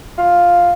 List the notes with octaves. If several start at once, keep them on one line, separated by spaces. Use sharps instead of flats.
F4